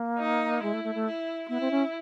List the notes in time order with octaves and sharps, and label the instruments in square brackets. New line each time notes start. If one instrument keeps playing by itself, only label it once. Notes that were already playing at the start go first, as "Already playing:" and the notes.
Already playing: [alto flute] A#3
[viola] D#4
[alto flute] G#3 [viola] E4
[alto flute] A3
A3
A3
[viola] E4
[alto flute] B3 [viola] E4
[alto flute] C4
C#4